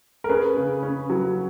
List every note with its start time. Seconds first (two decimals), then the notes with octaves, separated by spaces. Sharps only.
0.24 A#4
0.29 C#4 G#4 B4
0.57 C#3
0.83 C#4
1.10 F#3